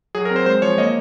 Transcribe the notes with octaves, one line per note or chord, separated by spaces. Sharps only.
F#3 G#4
A#4
C4
C5
G#3 C5
F3 C#5
A#3 D#5